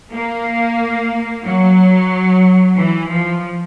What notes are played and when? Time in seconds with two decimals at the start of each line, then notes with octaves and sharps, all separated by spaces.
0.13 A#3
1.45 F#3
2.76 E3
3.10 F3